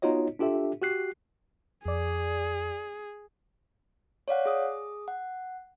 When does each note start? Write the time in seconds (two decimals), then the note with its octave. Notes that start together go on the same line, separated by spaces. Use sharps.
0.02 B3 D#4 F4 F#4 C#5 D#5
0.39 D4 F4 G4 A4 E5
0.81 F#4 G4 F#6 C7
1.86 F2 G#4 D5
4.28 C#5 D5 F5 F#5
4.46 G#4 D#6
5.08 F#5